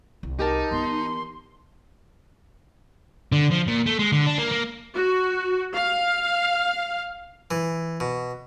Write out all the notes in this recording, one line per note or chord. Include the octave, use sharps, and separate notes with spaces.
C2
D#4 G4 A#4 A5
E3 B3 C6
D3
F3
A#2
A3
G#3
D3
D4
A#3
A#3
F#4
F5
E3
B2